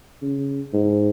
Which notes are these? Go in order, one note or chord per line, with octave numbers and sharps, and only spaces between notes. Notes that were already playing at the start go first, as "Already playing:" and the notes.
C#3
G#2